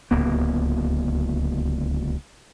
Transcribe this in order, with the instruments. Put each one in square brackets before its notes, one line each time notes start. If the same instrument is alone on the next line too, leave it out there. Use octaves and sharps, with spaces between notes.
[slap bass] D1 C#2 A#3 B3